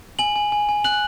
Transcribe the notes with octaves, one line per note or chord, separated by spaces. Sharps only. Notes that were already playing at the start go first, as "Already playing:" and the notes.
G#5 F#7
G#5
G#5
G#5
F#6 F#7